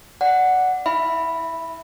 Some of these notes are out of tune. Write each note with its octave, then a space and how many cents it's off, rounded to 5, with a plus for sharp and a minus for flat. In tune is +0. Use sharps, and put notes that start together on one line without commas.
D5 +0 F#5 +0
E4 -25 E5 +5 B5 +0